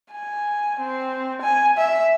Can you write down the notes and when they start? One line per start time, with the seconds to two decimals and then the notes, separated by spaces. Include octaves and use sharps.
0.12 G#5
0.81 C4
1.42 G#5
1.78 E5